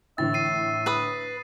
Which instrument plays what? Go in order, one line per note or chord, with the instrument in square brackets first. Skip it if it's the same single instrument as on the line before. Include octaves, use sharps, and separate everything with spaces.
[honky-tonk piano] A2 D3 E3 [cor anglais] E5 [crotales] A6
[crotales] C7 D#7
[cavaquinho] B4 B5 D#6